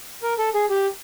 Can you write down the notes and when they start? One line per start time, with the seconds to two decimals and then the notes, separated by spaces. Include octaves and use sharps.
0.23 A#4
0.38 A4
0.54 G#4
0.70 G4